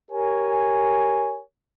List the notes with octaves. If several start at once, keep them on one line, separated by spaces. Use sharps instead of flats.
G4 A#4 C#5 G#5